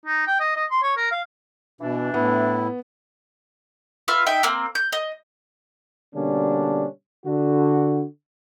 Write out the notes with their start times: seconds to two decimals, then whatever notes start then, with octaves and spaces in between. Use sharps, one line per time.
0.06 D#4
0.27 G5
0.40 D#5
0.56 D#5
0.71 C6
0.82 C#5
0.97 A#4
1.11 F5
1.81 B2 E3 D4
2.14 A2 B3 E4
4.08 F4 B4 E5 F6
4.26 D#4 E5 G5
4.43 A#3 C4
4.75 G6
4.92 D#5
6.14 B2 D3 G3 A#3 C#4 D4
7.25 D3 F#4